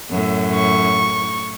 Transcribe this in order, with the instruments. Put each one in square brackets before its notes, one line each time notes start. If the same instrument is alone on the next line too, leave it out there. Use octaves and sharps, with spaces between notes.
[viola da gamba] F#2 A2
[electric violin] C#6